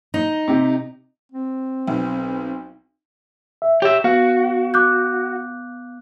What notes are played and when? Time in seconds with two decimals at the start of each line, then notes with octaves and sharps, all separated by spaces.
0.14 D#4
0.48 C3 G4
1.31 C4
1.87 B1
3.62 E5
3.82 G4 C#5 E5
4.04 B3 F#4 F5
4.74 D6 F#6 G6